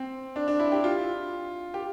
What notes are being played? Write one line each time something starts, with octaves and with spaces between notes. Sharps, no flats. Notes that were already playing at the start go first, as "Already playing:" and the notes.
Already playing: C4
D4
D4
E4
G4
F4
G4